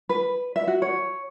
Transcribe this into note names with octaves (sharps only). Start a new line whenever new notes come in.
B4
E5
F#4
C#5